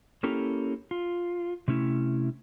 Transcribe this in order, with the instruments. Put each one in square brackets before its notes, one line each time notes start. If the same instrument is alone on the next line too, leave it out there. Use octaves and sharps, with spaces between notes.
[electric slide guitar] A#3 C#4 E4 G4 A4 A#4
F4
C3 A3 C#4 E4